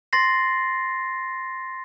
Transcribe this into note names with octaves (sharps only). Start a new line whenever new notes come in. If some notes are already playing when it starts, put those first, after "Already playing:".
C6 A6 A#6 C7